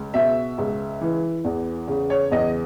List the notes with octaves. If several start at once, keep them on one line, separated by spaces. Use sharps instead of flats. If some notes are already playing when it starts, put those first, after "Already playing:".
Already playing: C#2
B2 E5
C#2
E3
E2
C#3
C#5
E2 D#5